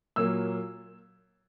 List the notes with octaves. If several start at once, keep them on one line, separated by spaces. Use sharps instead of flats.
A#2 F#3 A#3 E6